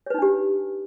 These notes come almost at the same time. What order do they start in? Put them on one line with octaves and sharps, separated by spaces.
C#5 B4 D#4 D4 G4